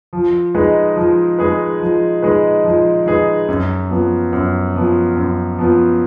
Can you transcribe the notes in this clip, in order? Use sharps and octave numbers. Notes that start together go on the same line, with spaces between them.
F3
G#3 D#4 G#4 B4
F3
G#3 D#4 G#4 B4
F3
G#3 D#4 G#4 B4
F3
G#3 D#4 G#4 B4
F#2
F3 B3
F#2
F3 B3
F#2
F3 B3